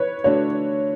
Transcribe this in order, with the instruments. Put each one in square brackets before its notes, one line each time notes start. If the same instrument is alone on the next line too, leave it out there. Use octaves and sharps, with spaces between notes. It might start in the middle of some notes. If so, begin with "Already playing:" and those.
Already playing: [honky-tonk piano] B4 C#5
[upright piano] D3 A3 D4 F#4 [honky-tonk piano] C#5